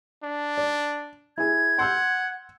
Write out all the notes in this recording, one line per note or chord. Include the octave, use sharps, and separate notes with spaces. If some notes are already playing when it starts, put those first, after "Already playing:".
D4
D5
E4 G#4 G#6
F#5 C6 E6 G6